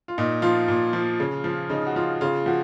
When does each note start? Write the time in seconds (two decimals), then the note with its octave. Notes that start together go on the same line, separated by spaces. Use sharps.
0.08 F4
0.18 A#2 D#4
0.42 F3 F4
0.68 A#2
0.93 F3
1.20 C#3
1.44 F3
1.70 C#3 D#4
1.87 F#4
1.96 F3 F4
2.21 C#3 F4
2.46 F3 F#4